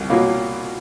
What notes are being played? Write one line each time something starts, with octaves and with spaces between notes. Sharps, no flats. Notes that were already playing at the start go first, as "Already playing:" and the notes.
Already playing: C2
B2 F#3 A#3